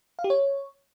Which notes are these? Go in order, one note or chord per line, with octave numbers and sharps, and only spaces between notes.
F5
G4
C#5